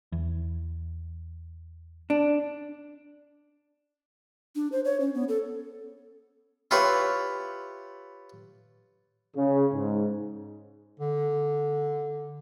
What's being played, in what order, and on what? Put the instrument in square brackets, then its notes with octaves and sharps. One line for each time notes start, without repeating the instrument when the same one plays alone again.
[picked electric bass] E2
[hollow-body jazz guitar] D4
[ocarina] D4
C5
C#5
C#4
B3
A4
[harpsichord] E4 F4 G4 B4 C#5
[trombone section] C#3
G#2
[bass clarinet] D3